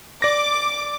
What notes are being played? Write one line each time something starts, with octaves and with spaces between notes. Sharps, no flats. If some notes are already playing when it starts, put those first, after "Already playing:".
D5 D6 A#6